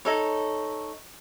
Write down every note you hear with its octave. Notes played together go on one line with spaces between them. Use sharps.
D#4 A4 C#5